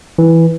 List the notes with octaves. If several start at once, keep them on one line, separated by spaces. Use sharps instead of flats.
E3